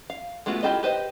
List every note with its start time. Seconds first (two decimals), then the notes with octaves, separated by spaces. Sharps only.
0.10 F5
0.46 G#3 A3 B3 F4 F#4
0.63 E4 F4 G4 A4 D#5
0.83 G4 B4 C5 D#5